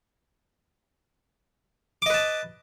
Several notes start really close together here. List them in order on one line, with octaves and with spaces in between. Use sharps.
D6 D#5 B4 A5